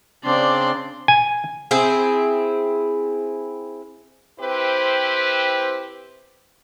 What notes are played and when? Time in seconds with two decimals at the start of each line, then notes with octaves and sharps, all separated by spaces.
0.25 C#3 C4 D4 D5 C6
1.08 G#5
1.71 C4 E4 G#4
4.39 C4 E4 G4 B4 C5